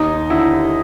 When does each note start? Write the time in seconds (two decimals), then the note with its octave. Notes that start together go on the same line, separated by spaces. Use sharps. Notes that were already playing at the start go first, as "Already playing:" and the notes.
Already playing: D#2 D#4
0.30 D3 E4